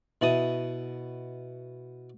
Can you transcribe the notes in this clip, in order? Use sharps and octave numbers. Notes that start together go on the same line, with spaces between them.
B2 E4 A5 D#6